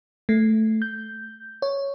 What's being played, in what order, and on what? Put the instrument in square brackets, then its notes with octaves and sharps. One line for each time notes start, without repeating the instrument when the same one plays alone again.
[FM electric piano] A3
G6
C#5